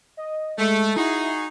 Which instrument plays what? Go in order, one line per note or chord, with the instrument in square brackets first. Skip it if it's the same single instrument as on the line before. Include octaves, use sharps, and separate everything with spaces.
[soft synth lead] D#5
[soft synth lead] G#3 [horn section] A3
[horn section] D#4 F#4 G#4 [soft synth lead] E4